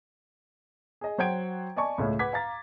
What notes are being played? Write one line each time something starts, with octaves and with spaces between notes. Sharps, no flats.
G#4 D#5
F#3 C5 F#5 G5 G#6 D7
D5 D#5 G#5 A5 C#6
C#2 A2 C#5
B4 F#5 D6 G#6 B6
F5 A#5 A6